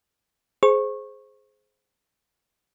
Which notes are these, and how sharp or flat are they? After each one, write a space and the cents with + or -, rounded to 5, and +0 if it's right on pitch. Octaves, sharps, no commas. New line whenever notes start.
G#4 +20 C5 +0 C#6 -20